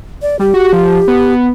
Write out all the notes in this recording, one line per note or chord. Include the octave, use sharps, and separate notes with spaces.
D5
G3 G4
F#4
F3
B3